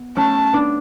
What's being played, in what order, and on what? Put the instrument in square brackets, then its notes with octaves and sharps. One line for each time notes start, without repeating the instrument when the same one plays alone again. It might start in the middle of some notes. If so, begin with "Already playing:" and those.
Already playing: [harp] B3
[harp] A3 C#4 [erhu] A5
[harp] B3 D4